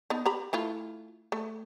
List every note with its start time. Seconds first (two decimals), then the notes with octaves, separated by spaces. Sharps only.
0.10 B3 D#4
0.26 G4 A#5 B5
0.53 A3 E4 F4
1.32 A3